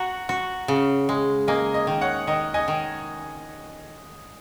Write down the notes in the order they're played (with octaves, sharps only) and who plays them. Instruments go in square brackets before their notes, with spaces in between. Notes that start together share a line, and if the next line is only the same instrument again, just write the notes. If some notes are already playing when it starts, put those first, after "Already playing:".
Already playing: [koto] F#4 [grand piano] F#5 A#5
[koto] F#4
C#3
G#3
[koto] A#3 [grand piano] D#5 G#5
[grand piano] D#5
[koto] D#3
[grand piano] C#5 F#5
[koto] D#3 [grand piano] D#5
[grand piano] D#5 G#5
[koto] D#3